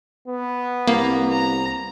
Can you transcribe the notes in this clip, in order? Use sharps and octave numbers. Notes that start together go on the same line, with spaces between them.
B3
C2 A#3 A#5
A#5